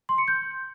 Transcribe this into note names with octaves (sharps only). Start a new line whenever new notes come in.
C6
C#7
G6